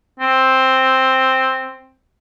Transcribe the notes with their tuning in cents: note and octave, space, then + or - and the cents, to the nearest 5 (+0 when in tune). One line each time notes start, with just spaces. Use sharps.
C4 +5